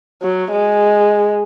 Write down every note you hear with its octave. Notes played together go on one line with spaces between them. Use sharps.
F#3
G#3